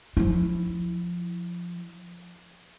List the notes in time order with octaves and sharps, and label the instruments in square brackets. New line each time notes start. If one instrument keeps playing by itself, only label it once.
[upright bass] F3 E4